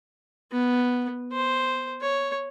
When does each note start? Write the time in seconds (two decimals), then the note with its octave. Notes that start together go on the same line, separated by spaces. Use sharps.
0.51 B3
1.32 C5
2.01 C#5